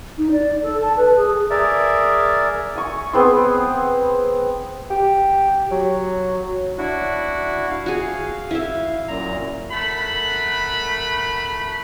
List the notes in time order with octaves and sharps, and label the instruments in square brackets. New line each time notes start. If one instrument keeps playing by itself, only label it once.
[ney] D#4
D5
A4
A5
B4
G#4
[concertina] G#4 A#4 D5 E5
[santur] G#5 C#6
B3 C4 G#4 C6
[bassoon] G4
F#3
[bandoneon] D4 E4 F#4
F5
[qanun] F#4 G#4
E4 E5
[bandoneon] F#2 A#2 A#5
[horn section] A3 A#4 F#5 B5